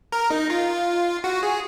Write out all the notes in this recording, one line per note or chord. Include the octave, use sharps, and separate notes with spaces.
A#4
D#4
F4
F#4
G#4